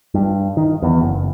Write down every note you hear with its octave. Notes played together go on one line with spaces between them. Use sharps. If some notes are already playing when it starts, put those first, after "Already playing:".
G2
D#3
E2
F#1